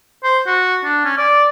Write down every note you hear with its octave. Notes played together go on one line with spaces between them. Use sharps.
C5
F#4
D4
C#4
D5